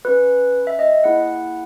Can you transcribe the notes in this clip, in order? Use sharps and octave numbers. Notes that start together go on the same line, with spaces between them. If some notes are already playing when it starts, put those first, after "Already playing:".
C#4 F#4 B4
E5
D#5
A#3 E4 G#4 F#5